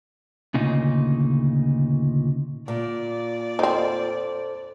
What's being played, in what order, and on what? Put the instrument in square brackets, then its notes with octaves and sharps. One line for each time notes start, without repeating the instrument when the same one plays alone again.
[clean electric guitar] D2 A#2 C#3 D#4
[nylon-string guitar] A#2 [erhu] D5
[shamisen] C4 D#4 [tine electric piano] A4 C5